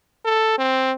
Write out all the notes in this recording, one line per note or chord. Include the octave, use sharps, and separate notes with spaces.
A4
C4